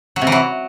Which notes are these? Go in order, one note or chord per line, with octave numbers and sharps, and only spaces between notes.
F#3
C3
E3
F#3